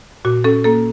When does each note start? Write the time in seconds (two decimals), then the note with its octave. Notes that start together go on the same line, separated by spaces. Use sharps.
0.25 A#2 F#4
0.44 C#4 A4
0.64 A#3 A4